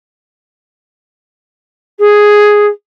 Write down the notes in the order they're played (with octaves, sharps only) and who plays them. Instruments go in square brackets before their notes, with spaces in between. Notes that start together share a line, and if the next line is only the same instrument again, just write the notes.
[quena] G#4